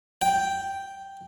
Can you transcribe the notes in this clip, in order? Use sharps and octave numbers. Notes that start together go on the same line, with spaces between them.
G5